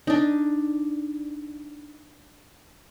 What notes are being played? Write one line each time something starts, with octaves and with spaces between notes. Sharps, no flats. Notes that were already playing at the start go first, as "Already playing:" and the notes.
D4 D#4